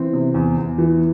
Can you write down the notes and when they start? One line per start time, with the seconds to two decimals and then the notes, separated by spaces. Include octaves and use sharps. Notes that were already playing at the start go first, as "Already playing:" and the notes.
Already playing: E3 C4
0.13 C3
0.34 E2
0.57 E2
0.78 E3